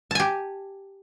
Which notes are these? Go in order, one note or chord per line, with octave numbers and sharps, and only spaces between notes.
G4 G#5 A5